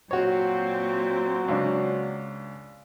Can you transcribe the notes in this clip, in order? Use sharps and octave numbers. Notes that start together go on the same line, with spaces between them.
A#2 F#3 C4 F#4 C#5
C#2 D4